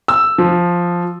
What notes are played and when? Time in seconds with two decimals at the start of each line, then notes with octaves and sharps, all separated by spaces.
0.08 E6
0.38 F3